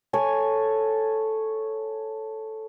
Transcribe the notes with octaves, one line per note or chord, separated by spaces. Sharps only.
A4 C#5 G#5